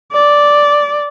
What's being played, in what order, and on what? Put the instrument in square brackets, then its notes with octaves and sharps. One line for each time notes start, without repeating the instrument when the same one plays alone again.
[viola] D5